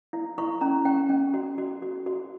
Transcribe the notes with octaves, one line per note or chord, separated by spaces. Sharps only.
E4
E4 C#6
C#4 A#5
C#4 G5
C#4
F#4
F#4
F#4
F#4